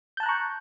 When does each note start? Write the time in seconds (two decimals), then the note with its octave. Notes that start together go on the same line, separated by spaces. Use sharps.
0.17 G6
0.20 A5
0.23 F#6
0.26 A#5
0.29 C#6